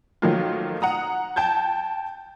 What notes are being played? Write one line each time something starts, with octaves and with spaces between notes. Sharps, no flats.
D#3 F3 F#3 A3 A#3 F4
F#5 A#5 D#6
G5 A5 G6 G#6